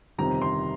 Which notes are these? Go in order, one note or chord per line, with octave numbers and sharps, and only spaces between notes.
G1 F2 C3 D#3 A#5
C6